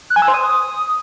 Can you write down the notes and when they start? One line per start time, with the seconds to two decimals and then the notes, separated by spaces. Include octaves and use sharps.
0.10 F#6
0.16 G#5
0.22 E6
0.28 C5
0.34 D#6